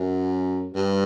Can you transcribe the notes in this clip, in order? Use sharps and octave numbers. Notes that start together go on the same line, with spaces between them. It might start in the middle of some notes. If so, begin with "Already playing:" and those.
Already playing: F#2
G2